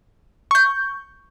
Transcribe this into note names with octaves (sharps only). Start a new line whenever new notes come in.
C#6 G6